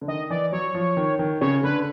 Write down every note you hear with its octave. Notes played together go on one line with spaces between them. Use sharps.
D3
D#3 D#5
E3 D5
F#3 C#5
F3
D#3
D#3
C#3 C#5
D3 B4